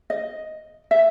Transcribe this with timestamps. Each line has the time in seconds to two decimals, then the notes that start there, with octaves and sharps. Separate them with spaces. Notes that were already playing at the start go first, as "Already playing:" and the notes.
0.10 D#5
0.91 E5